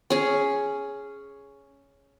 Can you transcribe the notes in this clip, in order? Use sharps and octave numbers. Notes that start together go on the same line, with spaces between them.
C#4 G#4